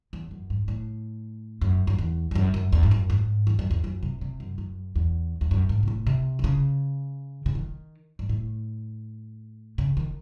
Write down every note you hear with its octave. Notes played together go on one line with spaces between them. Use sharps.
E2
F#2
G#2
A2
F#2
F#2
E2
E2
F#2
F#2
E2
G#2
F#2
G#2
E2
F#2
E2
F#2
C3
C3
F#2
F#2
E2
E2
F#2
G#2
C3
A2
C3
D#3
C#3
C#3
D#3
G#2
A2
C#3
D#3